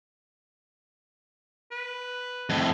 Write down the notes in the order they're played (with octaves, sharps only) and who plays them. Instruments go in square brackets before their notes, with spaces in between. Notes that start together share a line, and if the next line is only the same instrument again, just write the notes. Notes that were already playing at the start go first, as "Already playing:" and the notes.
[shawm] B4
[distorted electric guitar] F2 A2